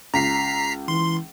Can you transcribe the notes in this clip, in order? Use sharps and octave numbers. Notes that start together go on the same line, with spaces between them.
C#2 A#5 B6 C7
E3 C6